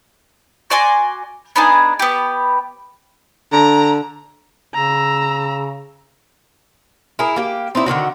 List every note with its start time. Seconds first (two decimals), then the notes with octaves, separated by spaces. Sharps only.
0.70 F#4 D5 G#5 C6
1.56 B3 D4 D#4 G#4
1.99 B3 G4
3.52 D3 A#5
4.74 C#3 A#5 E6
7.19 E4 G#4 A#4
7.36 A#3 G4
7.75 C4 D#4 E4 D5
7.86 D3 D#3 C4 F#4